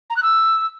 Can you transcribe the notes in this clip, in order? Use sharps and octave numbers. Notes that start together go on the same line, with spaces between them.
A#5
F#6
E6